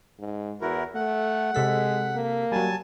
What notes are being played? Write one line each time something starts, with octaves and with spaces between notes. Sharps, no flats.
G#2
E2 E4 F#4 A#4
A3 F#5
C3 G#3 A4 B6
A#3
F#3 G3 G#5 A5